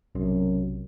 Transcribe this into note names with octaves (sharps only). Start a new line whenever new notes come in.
B1 F#2 C3